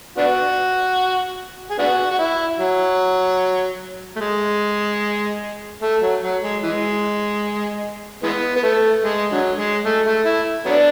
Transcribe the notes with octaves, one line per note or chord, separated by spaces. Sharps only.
B3 D4 F#4
G#4
B3 D4 F#4
F#4
E4
F#3
A3
G#3
A3
F#3
F#3
G#3
E3 G#3
E3 G#3 B3
B3
A3
G#3
D3 F#3
G#3
A3
A3
E4
F#3 B3 D4